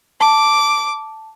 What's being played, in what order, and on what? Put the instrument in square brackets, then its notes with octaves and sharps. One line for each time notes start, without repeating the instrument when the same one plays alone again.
[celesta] A5 [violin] D6